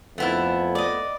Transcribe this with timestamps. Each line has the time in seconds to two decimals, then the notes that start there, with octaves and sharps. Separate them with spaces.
0.18 F2 A3 B3 E4
0.75 D5 D#5